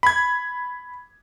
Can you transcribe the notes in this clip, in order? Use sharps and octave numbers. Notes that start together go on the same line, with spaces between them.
B5 G#6